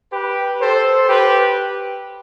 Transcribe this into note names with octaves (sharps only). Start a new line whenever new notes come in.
G4 B4
A4 C5
G4 B4